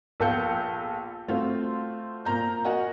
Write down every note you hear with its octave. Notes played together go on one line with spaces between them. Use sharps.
A#1 B3 A4 F5 G6 C#7
A3 C4 F4 F#4
A#2 A#3 A#5 G6
F#4 A#4 D#5 F#5 G#5